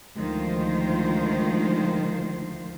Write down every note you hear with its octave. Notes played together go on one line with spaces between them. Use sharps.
D2 D#3 F3 G#3 F4 C5